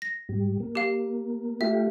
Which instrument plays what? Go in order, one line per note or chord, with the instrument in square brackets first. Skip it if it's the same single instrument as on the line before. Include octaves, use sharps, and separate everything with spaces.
[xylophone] A#6
[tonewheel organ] G#2 G3
A#3
[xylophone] G4 F5
[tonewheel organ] A3 F4 G4 [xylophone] E5